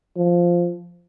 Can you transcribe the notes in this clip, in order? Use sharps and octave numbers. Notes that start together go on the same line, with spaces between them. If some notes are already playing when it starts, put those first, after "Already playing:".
F3